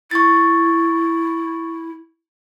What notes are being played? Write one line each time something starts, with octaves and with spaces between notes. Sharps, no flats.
E4 C#6 A6